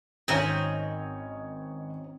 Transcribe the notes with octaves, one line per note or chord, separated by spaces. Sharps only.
G#1 C4 C#4 D#4 C#5